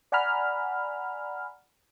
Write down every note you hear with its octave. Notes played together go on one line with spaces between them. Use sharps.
D5 F#5 G#5 A#5 B5 F6